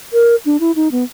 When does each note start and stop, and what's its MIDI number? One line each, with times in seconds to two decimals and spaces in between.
0.13 0.36 70
0.46 0.57 62
0.60 0.72 64
0.76 0.88 63
0.92 1.04 59